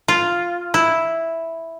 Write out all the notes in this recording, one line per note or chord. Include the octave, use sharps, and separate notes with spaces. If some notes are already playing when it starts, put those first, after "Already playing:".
F4
E4